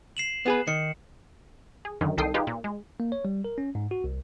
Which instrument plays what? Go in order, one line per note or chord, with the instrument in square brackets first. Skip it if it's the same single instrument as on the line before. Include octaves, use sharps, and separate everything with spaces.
[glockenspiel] C7 E7 F#7
[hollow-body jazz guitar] B3 G#4 B4
[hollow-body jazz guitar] D#3 [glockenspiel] C#7
[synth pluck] G#4
F#2 D3 D#3
C2 D#3 A4 G5 D#6 C7
D#4 F4 G4 G#4 B4
A#2
G#3
[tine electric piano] A#3
C#5
G3
A#4
C#4
G#2
F#4
C2